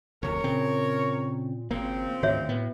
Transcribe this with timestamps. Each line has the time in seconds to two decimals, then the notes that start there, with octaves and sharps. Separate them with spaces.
0.23 F1 D2 A#4 C#5
0.44 A#2 C#3 C4
1.71 G#1 C#3 F3 A#3 C4
2.23 D2 G#2 D#3 F#4 C#5 E5
2.49 A2 B3